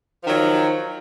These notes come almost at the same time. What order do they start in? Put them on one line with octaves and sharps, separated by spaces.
F3 D#3 F#3